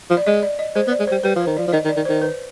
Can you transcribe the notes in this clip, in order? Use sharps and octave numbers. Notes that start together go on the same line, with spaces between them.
F3
D5
G#3 D#5
D5
D#5
G#3 C5
B3
D5
G#3
C5
G3
G3 B4
F3 C5
D#3
F3 D5
F3
D#3 D#5
D#3
D5
D#3
C5
D#3
B4